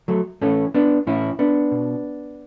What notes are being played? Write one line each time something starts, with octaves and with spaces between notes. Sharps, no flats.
F#3 A3
A2 E3 A3 C#4
B3 D4
A2 E3 C#4 E4
B3 D4
B2